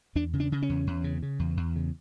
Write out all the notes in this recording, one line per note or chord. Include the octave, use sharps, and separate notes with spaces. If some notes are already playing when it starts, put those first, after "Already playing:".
E2 D4
C#3
D4
C#3
C#4
E2
E2
C#3
C#3
E2
E2
C#3